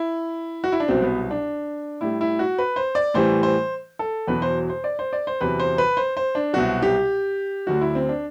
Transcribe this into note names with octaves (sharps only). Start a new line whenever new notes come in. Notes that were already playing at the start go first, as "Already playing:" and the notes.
Already playing: E4
F#4
E4
D4
C2 B2 F#3 C4
B3
D4
A2 G3 E4
E4
F#4
B4
C5
D5
A2 E3 G3 C5
C5
A4
E2 B2 F#3 B4
C5
C5
D5
C5
D5
C5
E2 C3 F#3 B4
C5
B4
C5
C5
D4
C2 B2 F#3 F#4
G4
D2 D3 F#3 F#4
E4
C4
D4